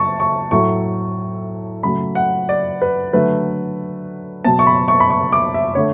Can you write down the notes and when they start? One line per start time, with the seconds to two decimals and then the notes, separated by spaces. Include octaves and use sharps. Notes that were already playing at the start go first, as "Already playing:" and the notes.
Already playing: F#3 A5 C#6
0.20 C#6
0.51 A2 F#3 A3 C#6
1.83 C#3 F#3 A3 B5
2.15 F#5
2.49 D5
2.82 B4
3.13 D3 F#3 A3 B4
4.44 B2 F#3 B3 A5
4.59 C#6
4.67 B5
4.88 C#6
5.00 B5
5.10 C#6
5.33 D6
5.54 E5
5.75 D3 A3 C#5